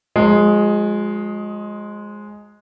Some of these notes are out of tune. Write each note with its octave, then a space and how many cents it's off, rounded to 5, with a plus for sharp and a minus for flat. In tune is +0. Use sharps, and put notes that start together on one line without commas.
F3 +45 G#3 +0